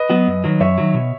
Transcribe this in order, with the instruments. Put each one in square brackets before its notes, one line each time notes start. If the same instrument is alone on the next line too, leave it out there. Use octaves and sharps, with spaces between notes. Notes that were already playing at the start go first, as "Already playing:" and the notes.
Already playing: [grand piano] B4 D#5
[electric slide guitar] F#3 B3 F#4
F#2
D#3 F#3
[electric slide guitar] F#2 [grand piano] C#5 E5
[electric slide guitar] D#3 F#3
B2